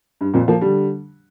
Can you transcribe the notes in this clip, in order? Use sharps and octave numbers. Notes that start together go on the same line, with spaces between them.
G2
F2 A#2
F3 A#3
D3 G3